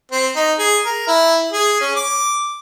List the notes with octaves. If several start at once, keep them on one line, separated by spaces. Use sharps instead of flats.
C4
D#4
G#4
A#4
E4
G#4
C#4
D6